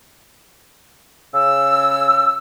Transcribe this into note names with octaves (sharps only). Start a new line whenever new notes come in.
C#3 E6